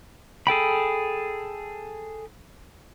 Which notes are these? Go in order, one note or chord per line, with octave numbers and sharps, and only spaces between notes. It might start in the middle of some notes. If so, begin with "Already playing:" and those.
G#4 A4 G5 B5